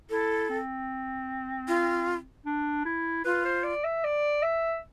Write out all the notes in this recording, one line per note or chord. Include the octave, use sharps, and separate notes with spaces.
E4 A4
C4
F4
D4
E4
F4 B4
C5
D5
E5
D5
E5